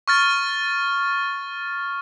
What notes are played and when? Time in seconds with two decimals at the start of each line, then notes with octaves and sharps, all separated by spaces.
0.08 C#6 F6 A6